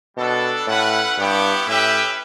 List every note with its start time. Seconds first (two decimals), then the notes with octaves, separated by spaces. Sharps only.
0.17 B2 G3 B3 D4 A4
0.67 A2 C#4 E4 B4 F#5
1.17 G2 B3 E4 G4 C#5
1.67 A2 C#4 G4 B4 E5 G5